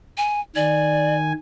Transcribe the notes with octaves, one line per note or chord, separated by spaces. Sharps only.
G#5
D#3 D5 G#5